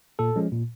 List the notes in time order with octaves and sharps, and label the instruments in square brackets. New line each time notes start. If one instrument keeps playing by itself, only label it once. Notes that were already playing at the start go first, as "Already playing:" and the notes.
[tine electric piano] A#2 A4
F3 G#3 C#4
A#2